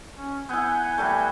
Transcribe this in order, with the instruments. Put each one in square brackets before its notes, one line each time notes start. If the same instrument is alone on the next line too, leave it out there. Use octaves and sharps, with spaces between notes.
[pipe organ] C#4
[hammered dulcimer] B3 E4 [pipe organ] F#5 G#5 G6
[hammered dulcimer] E3 G3 A3